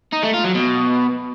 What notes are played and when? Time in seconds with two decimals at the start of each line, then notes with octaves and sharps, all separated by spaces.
0.12 D#4
0.23 A3
0.33 F4
0.44 F#3
0.55 B2